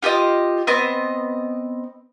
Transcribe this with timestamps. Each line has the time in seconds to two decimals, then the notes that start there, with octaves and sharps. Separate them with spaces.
0.03 F4 G4 A4 D#5
0.67 B3 C4 D#5